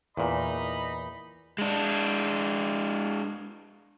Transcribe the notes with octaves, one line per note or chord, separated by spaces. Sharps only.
E2 A#2 D#4 D#5 B5
G#3 D4